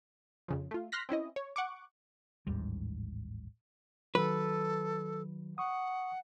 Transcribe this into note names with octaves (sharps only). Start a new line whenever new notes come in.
F2 C#3 F3
A3 F4
C6 F6 F#6 A#6 B6
C4 C#4 E4 D#5
C#5
F#5 C#6 D6
A1 D#2 G#2 G3
D#3 F#3 A4 B4
F#5 C#6 D#6